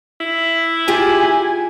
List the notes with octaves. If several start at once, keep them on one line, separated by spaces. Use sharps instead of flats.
E4
F4 G4 G#4 G#5